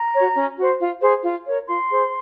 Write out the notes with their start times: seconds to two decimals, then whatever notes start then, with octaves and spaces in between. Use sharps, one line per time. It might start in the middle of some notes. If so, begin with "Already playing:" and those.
Already playing: A#5
0.14 F#4 C#5
0.36 C#4
0.58 F#4 C5
0.80 F4
1.03 G#4 C5
1.24 F4
1.47 A#4 C#5
1.68 F4 C6
1.90 G#4 C5